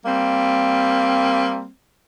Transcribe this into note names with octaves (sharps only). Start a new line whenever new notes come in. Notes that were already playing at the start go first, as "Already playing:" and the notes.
G3 A#3 C4